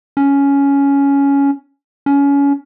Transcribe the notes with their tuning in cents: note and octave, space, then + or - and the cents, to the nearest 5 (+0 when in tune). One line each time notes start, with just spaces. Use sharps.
C#4 +10
C#4 +25